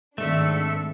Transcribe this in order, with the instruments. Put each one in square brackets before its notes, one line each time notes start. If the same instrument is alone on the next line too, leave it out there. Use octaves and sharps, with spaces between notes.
[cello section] G#2 C4 E5 [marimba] D#3 [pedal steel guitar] A3 [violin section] D4 E6 C#7